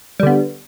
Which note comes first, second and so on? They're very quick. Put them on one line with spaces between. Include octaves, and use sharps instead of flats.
G3 D3 B3